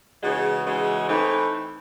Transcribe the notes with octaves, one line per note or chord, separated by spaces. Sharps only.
C#3 E3 G#3 D#4 F#4
C#3 E3 G#3 D#4 F#4
E3 A3 C4 D#4